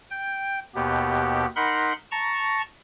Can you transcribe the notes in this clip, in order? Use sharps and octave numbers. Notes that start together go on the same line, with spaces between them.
G5
D#2 B2 B3 G4
D#4 A#4 F#5 B5 C6
A5 A#5 C#6